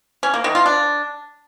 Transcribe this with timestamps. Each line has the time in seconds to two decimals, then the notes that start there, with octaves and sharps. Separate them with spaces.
0.23 C#4
0.34 A#3
0.44 D#3
0.55 F4
0.66 D4